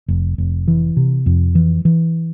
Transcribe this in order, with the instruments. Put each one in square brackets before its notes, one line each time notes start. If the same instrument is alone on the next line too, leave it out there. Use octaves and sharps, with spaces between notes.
[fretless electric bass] F1
F1
E3
C3
F2
E3
E3